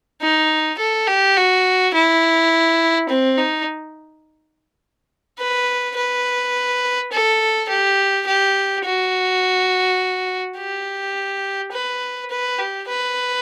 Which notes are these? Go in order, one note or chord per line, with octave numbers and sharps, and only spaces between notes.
D#4
A4
G4
F#4
E4
C4
D#4
B4
B4
A4
G4
G4
F#4
G4
B4
B4
G4
B4